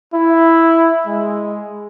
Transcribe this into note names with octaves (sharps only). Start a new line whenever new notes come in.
E4
G#3